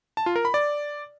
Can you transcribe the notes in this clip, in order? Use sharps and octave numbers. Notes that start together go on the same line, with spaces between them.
A5
F4
A#4
B5
D5